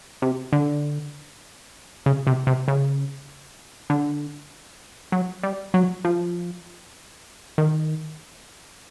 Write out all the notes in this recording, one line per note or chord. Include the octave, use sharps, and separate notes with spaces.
C3
D3
C#3
C3
C3
C#3
D3
F#3
G3
F#3
F3
D#3